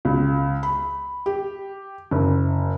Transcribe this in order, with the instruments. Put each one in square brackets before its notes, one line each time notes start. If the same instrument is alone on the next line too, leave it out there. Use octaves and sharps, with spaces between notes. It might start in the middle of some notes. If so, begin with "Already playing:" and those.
[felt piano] C#2
B5
G4
F#1